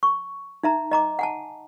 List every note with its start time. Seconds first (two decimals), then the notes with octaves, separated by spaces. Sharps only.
0.03 C#6
0.63 D#4 E5 A#5
0.91 D#5 A#5 D6
1.19 F#5 G#5 A5